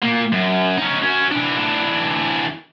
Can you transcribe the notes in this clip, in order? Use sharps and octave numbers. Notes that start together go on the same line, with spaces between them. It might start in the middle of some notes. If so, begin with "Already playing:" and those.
A#2 A#3
F#2
C#4 D#4
F#3 C#4
E3 D4